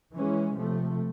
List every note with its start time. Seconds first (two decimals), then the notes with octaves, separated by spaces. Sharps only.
0.13 E3 G#3 C#4
0.54 C3 F3 A3